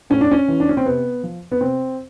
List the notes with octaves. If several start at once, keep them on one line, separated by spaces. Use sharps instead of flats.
A2 C#4
D4
C#4
E3
D4
C#4
C4
C3 B3
F3
B3
C3 C4